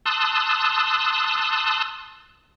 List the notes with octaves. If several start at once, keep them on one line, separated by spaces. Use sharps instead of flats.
A5 C6 D#6 E6 F#6